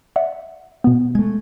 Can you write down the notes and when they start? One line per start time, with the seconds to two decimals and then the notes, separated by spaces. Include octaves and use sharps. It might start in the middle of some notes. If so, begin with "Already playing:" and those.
0.16 D5 E5 F#5
0.84 B2 B3
1.15 G#3 A3 G#6